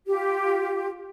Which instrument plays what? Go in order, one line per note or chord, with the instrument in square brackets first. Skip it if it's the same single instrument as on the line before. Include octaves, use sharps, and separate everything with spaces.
[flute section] F4 G4